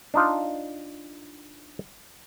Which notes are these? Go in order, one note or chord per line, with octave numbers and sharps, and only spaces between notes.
D4 D#4 F4